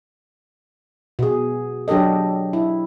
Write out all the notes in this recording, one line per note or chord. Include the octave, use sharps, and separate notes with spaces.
B2 G#4
F#3 D4 G4 A4 D#5
E4